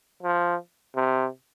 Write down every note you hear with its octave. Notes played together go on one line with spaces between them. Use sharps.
F3
C3